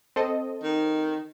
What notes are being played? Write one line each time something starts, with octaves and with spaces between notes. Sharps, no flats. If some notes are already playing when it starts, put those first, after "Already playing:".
C4 A4 D#5
D#3